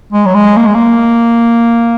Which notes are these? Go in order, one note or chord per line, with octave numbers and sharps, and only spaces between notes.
G#3
F#3
G#3
A#3
G#3
A#3